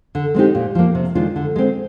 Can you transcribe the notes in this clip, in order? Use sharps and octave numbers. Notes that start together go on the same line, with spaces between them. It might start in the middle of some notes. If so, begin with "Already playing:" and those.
D3
G#3 C4 D#4 G4
A#2
F3 A#3
C3
D#3 G#3 D4 F4
D3
G#3 C4